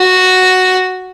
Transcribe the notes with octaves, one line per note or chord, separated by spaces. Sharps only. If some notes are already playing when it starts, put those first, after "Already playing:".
Already playing: F#4